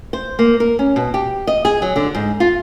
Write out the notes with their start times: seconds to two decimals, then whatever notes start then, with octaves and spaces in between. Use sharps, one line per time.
0.13 C5
0.39 A#3
0.60 A#4
0.79 C#4
0.96 B2
1.14 G4
1.47 D#5
1.65 G#4
1.82 F#3
1.96 D3
2.15 G#2
2.40 F4